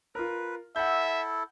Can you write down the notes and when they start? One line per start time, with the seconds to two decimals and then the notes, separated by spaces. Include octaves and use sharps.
0.15 F4 A#4 B4
0.76 E4 A4 E5 F#5 G6